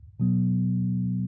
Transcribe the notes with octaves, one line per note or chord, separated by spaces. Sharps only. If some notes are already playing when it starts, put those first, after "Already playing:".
B2 F#3 B3